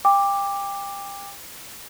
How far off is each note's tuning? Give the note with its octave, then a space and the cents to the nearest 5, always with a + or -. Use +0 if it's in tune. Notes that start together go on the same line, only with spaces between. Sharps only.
G5 +30 D6 +0